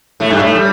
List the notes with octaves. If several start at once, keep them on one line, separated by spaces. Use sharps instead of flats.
A2 A3
G2 G3
A2 A3
G3